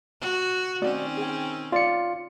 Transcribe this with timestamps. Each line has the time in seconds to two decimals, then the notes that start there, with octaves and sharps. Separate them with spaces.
0.22 F#4
0.82 D#3 C4 C#4 D#4 F#4 D5
1.17 G#4 G5
1.72 F4 C#5 D5 C#7